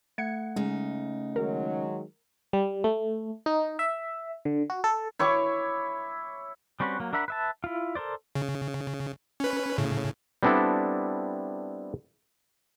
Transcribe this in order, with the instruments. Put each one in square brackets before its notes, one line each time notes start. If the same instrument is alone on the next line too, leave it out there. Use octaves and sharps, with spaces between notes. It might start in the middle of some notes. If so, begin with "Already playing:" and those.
[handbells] A3 F#5 [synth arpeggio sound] G#6 C#7
[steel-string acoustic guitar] C#3 D#4 [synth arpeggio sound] G#3
[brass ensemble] D#3 F#3 G#3 [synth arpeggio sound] A#4
[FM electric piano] G3
A3
D#4
E5
D3
F#4
A4
[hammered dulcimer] E4 C#5 C#6 D6
[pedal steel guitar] G3 C4 C#4 F#4 B4
F#3 A#3
D4 A#4 E5 F#5 B5
B4 E5 A5
E4 F4
A4 A#4 C5 D5
[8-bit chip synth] C#3
C#4 B4
A2 C#3
[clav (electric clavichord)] G3 B3 C4 D4 E4 A4